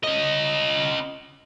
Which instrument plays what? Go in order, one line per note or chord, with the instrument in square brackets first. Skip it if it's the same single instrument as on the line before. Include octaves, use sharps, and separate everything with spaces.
[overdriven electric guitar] C#4 D#5